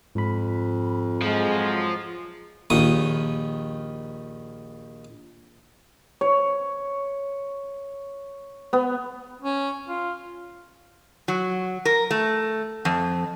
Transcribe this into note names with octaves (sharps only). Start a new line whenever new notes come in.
F2 G#2 B5
F3 F#3 G#3
A#1 D#2 D#3 D#6
C#5
B3
C#4
F4
F#3
A#4
A3
F2